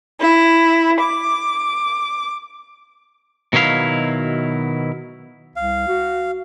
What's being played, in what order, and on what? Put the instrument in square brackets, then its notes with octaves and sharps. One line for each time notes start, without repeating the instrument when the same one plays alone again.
[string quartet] E4
D6
[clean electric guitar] B2 D#3 F#3 E4 F5
[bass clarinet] C2 [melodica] F5
[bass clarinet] F#4